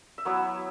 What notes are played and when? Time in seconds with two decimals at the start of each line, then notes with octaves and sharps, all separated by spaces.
0.18 E5
0.25 F#3 B3 E4 C#5